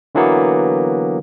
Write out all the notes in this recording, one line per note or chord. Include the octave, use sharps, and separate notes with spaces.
D3 E3 F#3 A#3 B3